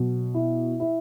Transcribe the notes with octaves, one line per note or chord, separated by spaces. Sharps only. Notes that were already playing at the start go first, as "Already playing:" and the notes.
Already playing: B2 F#3
E4
E4